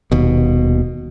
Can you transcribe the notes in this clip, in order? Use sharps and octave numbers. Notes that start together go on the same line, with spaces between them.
D#1 D#2 B2